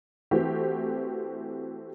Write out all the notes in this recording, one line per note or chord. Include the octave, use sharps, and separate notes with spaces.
E3 A3 C4 F#4 G4